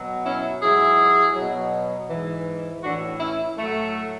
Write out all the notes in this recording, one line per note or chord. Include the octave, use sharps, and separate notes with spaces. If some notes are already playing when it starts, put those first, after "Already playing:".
Already playing: B2 F#3
C#4 E4
G#2 F#3 E4 G#4
B2 F#3
G#2 E3
A2 E3 D4 F#4
C#4 E4
A2 F#3 A3